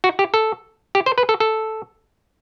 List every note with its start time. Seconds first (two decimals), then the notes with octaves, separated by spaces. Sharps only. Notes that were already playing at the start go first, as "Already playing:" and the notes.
0.04 F#4
0.19 G4
0.34 A4
0.95 G4
1.06 C5
1.18 B4
1.29 A4
1.40 A4